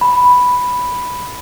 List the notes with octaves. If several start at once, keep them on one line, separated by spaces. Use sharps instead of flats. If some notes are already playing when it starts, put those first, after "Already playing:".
B5